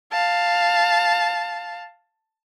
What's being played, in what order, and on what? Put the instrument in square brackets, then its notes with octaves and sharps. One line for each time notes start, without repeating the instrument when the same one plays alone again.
[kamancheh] F5 A5